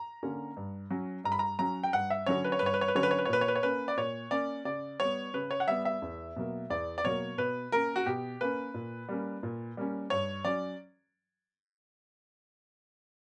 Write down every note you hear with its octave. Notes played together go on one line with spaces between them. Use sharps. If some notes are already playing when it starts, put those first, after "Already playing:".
Already playing: A#5
D3 A#3 C#4
G2
F#3 C#4
G2 A#5
B5
A#5
F#3 C#4 A#5
G5
G2 F#5
E5
D3 F#3 C#4 C#5
B4
C#5
G2 B4
C#5
B4
C#5
B4
D3 F#3 C#4 C#5
B4
C#5
B4
C#5
A#2 B4
C#5
B4
C#5
A#3 C#4 B4
D5
A#2 C#5
A#3 C#4 D5
C#3 D5
G3 B3 C#5
C#3 B4
C#5
F#5
G3 B3 E5
E5
E2
B2 F#3 A#3
E2 D5
D5
B2 F#3 A#3 C#5
B2 B4
A#3 C#4 A#4
F#4
B2 G4
A#3 C#4 B4
A#2
G3 A#3 C#4
A#2
G3 A#3 C#4
G2 C#5
F#3 C#4 D5